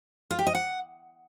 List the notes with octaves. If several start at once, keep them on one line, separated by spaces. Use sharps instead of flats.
F4
G4
D#5
F#5